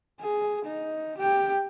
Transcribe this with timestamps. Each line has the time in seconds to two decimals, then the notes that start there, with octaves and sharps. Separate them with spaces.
0.21 G#4
0.65 D#4
1.18 G4 G5